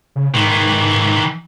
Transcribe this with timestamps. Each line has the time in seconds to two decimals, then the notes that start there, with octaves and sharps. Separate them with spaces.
0.16 C#3
0.34 G#2 D#3 E3